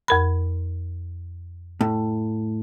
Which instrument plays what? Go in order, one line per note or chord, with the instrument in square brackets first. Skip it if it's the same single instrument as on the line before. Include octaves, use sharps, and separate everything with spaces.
[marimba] F2 A#4 B5
[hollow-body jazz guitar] A2